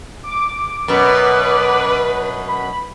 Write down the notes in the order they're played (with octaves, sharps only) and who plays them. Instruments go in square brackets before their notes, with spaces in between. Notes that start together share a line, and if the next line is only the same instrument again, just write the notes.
[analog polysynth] D6
[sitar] F#2 B2 [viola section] B4
[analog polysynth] B5